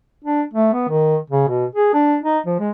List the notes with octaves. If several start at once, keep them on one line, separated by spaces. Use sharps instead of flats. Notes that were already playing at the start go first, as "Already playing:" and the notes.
D4
A3
B3
D#3
C#3
B2
G#4
D4
D#4
F3
G#3